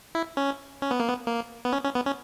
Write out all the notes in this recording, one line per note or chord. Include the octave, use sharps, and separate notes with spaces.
E4
C#4
C#4
B3
A#3
B3
A#3
B3
C#4
C#4
B3
C#4